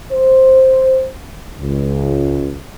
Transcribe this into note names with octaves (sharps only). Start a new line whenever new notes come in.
C5
C#2